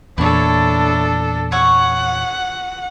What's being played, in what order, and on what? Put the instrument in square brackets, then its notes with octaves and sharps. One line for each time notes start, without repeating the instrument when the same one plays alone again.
[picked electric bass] E2 A#2 [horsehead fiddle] D4 A4 [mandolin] E4 C#5
[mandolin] C#5 C#6 E6 [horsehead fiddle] F#5